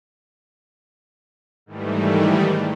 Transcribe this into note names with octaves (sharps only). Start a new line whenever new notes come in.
G#2 D#3 E3 G3 A3